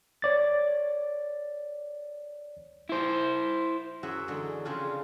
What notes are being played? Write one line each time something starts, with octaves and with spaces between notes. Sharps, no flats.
C#5 D5 A6
E4 C5
F#2 F#4 G#4 E5 F#5
D3 E3 F#3 G#3
C#3 F3 C4 D4 F4 G#5